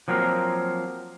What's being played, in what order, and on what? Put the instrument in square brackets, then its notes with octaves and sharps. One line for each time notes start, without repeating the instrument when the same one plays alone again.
[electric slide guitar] F3 F#3 A#3 C4 A#4